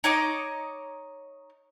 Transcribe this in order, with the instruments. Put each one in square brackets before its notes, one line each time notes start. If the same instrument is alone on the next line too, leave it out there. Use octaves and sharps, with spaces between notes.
[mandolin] D#4 C#5 D#5 D6